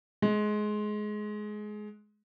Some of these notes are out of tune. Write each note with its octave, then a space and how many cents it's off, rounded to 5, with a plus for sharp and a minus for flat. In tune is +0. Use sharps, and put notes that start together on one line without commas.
G#3 +20